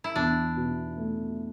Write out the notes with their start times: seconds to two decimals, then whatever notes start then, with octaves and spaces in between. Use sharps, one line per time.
0.04 E4
0.16 E2 D4
0.56 B2
0.98 A3